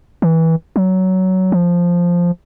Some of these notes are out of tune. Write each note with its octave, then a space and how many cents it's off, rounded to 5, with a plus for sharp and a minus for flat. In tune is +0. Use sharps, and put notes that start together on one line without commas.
E3 -20
F#3 +15
F3 +0